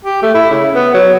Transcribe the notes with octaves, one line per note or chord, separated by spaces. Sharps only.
G4
A3
E4
C#3
B3
F#3